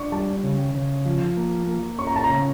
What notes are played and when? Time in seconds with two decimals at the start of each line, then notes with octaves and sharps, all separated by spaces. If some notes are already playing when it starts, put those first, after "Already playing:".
Already playing: D4 C#6
0.12 G3 A5
0.43 C#3
0.75 C#3
1.06 F3
1.37 A#3
1.67 A#3
1.99 C#4 C#6
2.07 A#5
2.16 A5
2.24 A#5
2.29 C#3